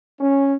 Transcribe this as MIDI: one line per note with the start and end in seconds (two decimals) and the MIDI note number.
0.21 0.54 61